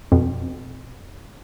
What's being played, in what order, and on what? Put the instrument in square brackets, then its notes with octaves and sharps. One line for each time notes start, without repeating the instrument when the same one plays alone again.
[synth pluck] F2 B2